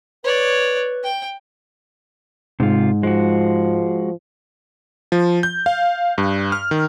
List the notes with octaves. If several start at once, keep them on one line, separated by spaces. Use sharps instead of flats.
B4 C#5 D5
G5
G#2 C3 F4
F3 G#3 F#4
F3
G6
F5
G2
F6
D#3